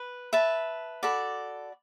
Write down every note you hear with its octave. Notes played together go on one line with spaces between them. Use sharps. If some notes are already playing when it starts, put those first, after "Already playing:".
Already playing: B4
B4 E5 A5
F#4 A4 D5 B5